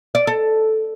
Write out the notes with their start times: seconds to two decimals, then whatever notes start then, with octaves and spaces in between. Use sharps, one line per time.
0.15 D5
0.27 A4